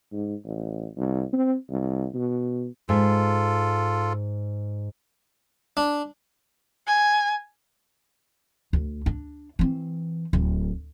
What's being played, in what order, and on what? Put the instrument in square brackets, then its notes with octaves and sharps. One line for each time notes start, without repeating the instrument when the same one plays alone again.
[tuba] G#2
A1
C2
C4
C2
B2
[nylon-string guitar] G#2 [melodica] F4 A4
[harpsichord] D4
[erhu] G#5
[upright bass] D2
D4
E3 C4
D1